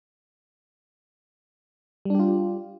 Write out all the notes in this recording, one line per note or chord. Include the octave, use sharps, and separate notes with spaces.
G3 D4 F4 G4